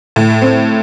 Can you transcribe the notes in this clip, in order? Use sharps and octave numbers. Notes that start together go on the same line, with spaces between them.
A2
C4